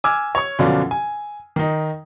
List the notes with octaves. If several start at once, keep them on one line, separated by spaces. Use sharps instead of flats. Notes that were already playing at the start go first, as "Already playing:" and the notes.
G#5 D6 E6 F6 G#6
C#5 C#6
F#2 B2 D3 F3 C#4 D4
G#5
D#3 D#4